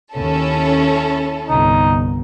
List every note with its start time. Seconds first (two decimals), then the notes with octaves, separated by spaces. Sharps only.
0.15 D#2 C#4 E4 A4
1.49 G1 C2 D#4